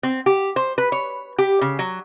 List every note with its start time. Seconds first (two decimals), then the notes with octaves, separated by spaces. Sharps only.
0.03 C4
0.26 G4
0.56 C5
0.78 B4
0.92 C#5
1.38 G4
1.61 C#3
1.79 F#3